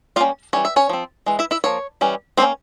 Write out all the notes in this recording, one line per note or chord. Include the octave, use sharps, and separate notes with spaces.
G3 A#3 C#4 F4 F5
E3 G3 C#4 C#5
E5
C#4 C#5
F3 C4
E3 G#3
E4 E5
E4 E5
F3 A#3 C#5
E3 G3 C#4
G3 A#3 C4 C#4 C5